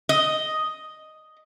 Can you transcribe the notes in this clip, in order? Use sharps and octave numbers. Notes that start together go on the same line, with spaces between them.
D#5